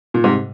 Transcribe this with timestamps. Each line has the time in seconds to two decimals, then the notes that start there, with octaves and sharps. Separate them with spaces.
0.14 A#2
0.24 G#2 C3